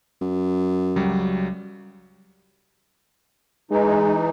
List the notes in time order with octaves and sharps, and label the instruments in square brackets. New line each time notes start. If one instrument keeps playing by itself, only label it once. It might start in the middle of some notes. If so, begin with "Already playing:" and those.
[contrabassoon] F#2
[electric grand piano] C#2 F#3 G3
[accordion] E3 D#4 [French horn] G#3